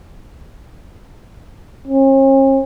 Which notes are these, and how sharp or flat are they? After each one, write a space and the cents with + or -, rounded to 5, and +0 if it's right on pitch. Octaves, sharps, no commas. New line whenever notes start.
C#4 -45